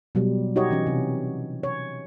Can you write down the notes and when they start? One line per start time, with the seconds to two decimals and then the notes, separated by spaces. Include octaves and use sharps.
0.15 B2 F#3 G3
0.56 D#4 F#4 G4 C#5 D#5
0.71 E3 C#4
0.87 C3
1.63 C#5